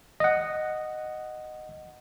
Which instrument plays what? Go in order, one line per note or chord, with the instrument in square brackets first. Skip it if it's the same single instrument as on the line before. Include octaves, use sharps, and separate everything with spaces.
[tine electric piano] D#5 F#5